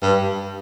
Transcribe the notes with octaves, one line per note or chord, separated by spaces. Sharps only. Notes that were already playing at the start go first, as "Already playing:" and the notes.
G2